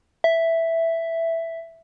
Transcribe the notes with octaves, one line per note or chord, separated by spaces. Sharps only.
E5